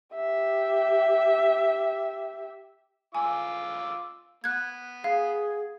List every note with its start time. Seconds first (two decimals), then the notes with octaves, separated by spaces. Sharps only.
0.15 G4 E5
3.15 F4 G#5 D6 E6
4.44 B3 F#6 G#6
5.04 G#4 F5